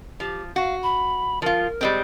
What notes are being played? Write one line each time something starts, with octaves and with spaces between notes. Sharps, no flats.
F3 G4
F#4 F5
B5
F3 F4 A#4
G3 G#3 C4